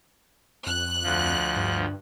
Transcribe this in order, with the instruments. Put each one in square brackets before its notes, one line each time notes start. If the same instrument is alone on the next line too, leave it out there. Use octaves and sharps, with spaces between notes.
[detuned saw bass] F2 [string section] F#6
[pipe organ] D2 F3
[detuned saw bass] G2